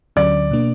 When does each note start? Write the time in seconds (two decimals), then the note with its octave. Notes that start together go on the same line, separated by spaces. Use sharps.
0.16 D2 D3 F#3 C#4 D5
0.51 B2 A#3 D4